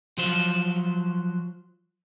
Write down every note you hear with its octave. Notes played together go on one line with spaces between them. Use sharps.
F3 F#3 C5